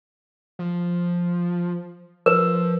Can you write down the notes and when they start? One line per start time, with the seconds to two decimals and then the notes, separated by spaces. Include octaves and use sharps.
0.59 F3
2.26 F3 A#4 B4